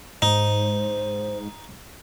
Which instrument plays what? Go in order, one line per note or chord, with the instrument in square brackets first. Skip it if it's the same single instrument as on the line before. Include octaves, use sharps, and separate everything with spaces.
[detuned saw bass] G#2 [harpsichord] D#4 [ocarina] C5